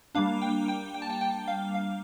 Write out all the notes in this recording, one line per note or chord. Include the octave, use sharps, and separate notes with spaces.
G3 A#3 D4 F5
G5
G5
G5
A5
G5
G5
F5
F5